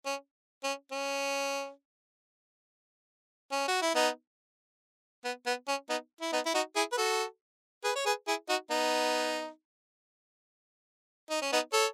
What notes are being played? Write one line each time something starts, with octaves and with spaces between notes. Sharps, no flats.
C#4
C#4
C#4
C#4
F#4
E4
B3 D#4
B3
B3
C#4
B3 D#4
E4
B3 D#4
E4
D#4 F#4
E4 G#4
B4
F#4 A4
G#4 B4
C#5
G#4 B4
E4 G#4
D#4 F#4
B3 D#4
D#4
C#4
B3 D#4
A4 C#5